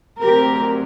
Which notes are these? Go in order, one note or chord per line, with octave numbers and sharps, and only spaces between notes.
D2 C3 F#3 C4 G4 A#4